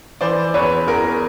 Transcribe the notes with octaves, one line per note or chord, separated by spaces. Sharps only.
E3 C5 D5
E2 B4 C#5
E2 G#4 A#4